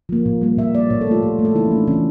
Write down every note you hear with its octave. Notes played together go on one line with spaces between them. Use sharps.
F3 A#3
A#2
G3 A#3
A#2 E5
G3 A#3 D5
A#2 C#5
A4
A3 F4
A#2 G4
A3
A4
E3 E4
C#4
A3
D4
E3 C#4